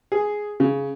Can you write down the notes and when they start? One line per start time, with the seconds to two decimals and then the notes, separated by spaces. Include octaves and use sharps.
0.12 G#4
0.60 C#3